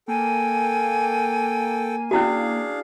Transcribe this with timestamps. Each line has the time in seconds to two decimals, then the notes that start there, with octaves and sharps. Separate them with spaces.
0.08 A#3 A4 G5 G#5
2.11 C#4 D4 E4 F#4 G#4 F5